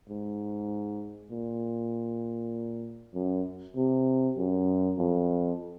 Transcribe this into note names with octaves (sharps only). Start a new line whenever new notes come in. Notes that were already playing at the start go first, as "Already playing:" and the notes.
G#2
A#2
F#2
C3
F#2
F2